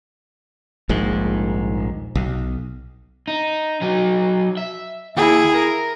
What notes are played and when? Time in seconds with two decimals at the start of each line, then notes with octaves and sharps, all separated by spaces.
0.89 D#1 A#1 G#2 G#3
2.15 B1
3.28 D#4
3.81 F#3 D#4
4.57 E5
5.17 D#2 E4 G#4
5.54 A#4